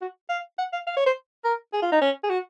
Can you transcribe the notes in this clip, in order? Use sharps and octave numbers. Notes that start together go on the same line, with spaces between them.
F#4
F5
F#5
F5
F5
C#5
C5
A#4
G#4
F4
D#4
C#4
G#4
F#4